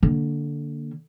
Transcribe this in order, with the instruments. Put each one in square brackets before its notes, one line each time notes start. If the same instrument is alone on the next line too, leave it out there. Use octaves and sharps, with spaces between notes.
[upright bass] D3 A#3